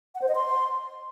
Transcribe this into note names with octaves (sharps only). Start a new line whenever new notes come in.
F#5
C5
D#5
C6